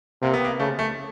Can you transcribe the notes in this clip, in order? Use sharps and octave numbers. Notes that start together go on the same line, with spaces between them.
C3 A#3
B3
A#3
C#3 A3
A3